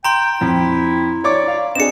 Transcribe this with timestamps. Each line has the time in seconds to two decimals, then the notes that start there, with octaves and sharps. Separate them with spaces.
0.05 G5 A#5 C6
0.41 F2 E4
1.24 C#5 D5 C#6 D6
1.48 F5
1.75 C4 D4 G#4 D#5 C#7 E7